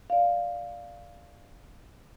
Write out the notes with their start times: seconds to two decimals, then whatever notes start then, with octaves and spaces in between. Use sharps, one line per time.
0.10 D5 F5